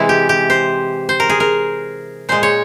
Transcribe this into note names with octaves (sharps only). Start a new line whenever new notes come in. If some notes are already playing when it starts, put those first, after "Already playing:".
Already playing: C3 E3 G#3 E4
G4
G4
C5
C5
A#4
G#4
A#4
A#2 G#3 C5
C#5